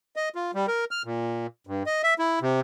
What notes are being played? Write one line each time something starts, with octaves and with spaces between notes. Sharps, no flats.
D#5
F4
G3
A#4
F6
A#2
G2
D#5
E5
E4
C3